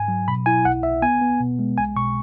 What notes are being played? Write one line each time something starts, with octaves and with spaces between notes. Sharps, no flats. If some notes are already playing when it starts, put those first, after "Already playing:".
Already playing: G#2 G#5
F#3
B2 B5
E4 G#5
B1 F#5
B1 E5
B3 G#5
B3
B2
G#3
B1 G#5
B2 C#6